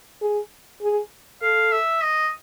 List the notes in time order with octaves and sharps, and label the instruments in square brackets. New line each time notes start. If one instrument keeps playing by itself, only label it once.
[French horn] G#4
G#4
[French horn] A4 [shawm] F5
[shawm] E5
D#5